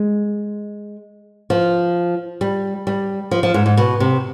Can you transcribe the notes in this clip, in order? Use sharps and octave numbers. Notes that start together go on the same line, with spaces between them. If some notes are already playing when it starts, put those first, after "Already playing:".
Already playing: G#3
F3
G3
G3
F3
F3
G#2
G#2
B2
C3